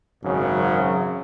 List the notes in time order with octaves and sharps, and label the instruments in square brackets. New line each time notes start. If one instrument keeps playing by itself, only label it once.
[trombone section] G#1 F#2 C#3 F#3